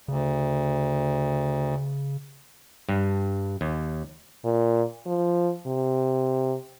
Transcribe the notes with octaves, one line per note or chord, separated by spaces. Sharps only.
D2 C#3
G2
D#2
A#2
F3
C3